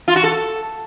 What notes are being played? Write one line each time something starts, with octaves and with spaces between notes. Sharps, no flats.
F4
F#4
A4